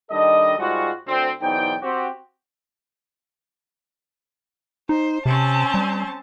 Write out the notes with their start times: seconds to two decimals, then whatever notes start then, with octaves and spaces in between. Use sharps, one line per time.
0.10 D#3 G3 D4 A4 D#5
0.58 G#2 G3 G#3 F4 F#4
1.07 D2 C4
1.41 B1 E2 D#4 C5 D5 G5
1.82 C4 F#4 G4
4.89 D#4 C5
5.26 C3 C4 C#4 A5
5.74 G3